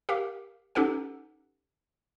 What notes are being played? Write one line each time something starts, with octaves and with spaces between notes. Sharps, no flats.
G4 A#4 F5
C#4 D#4 G4 A4 B4 F#5